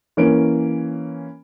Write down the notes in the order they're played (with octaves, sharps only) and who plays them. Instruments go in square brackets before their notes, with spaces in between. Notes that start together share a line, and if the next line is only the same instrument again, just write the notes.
[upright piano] E3 A#3 C#4 D7